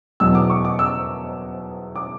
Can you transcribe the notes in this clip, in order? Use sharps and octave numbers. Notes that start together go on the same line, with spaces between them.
E2 B2 F#3 E6
D6
C#6
D6
E6
D6